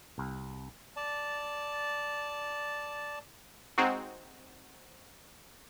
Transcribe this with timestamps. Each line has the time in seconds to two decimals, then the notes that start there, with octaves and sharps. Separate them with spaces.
0.18 C2
0.96 D5 A5
3.78 G#3 C4 D#4 F#4